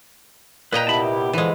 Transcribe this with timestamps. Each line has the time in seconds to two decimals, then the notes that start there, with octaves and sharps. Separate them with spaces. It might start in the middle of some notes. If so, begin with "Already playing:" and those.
0.72 A#2 B4 D#5 G5 A#5
0.87 C3 B3 E4 A5 B5
1.00 G4
1.33 D3 E3 F3 G#3